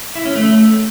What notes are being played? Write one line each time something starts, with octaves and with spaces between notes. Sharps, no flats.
E4
C#4
A3